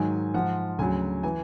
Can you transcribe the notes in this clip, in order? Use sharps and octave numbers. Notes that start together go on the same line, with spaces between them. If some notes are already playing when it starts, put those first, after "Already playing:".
Already playing: G#2 D#3 F#3 G#5
G#2 F3 F#5
D2 C#3 F#3 G#5
E3 G#5